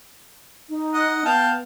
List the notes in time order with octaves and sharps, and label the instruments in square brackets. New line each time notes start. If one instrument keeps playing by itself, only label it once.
[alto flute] D#4
[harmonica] D#5 F#5
[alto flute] B3 [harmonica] F5 G5 A5